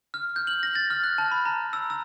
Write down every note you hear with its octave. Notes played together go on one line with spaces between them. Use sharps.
F6
G6
F#7
A#6
A6
F6
F#6
A5
B5
A#5
E6
E6